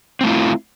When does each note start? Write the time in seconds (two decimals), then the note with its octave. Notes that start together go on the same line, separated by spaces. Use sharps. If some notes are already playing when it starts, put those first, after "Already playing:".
0.21 C4
0.23 A3
0.26 E4
0.29 F4